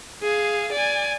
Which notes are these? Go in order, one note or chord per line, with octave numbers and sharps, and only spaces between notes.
G#4 F5
D5 G#5